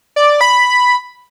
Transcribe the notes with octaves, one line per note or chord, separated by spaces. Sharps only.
D5
B5